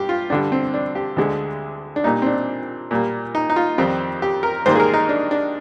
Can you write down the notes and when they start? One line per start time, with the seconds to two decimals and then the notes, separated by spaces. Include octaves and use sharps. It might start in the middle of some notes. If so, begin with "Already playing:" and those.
Already playing: G2 G4
0.09 F4
0.30 G2 D3 G3 D4
0.52 C4
0.74 D4
0.95 G4
1.17 D2 D3 G#3
1.96 D4
2.04 A#2 G3 A#3 D#4
2.22 C4
2.26 D4
2.91 A#2 G3 A#3
3.35 D#4
3.50 D#4
3.56 F4
3.78 F2 D#3 G3 C4 G4
4.22 G4
4.43 A#4
4.66 G#2 D#3 G3 A#3 C5
4.76 G#4
4.80 A#4
4.94 D#4
5.09 D4
5.31 D4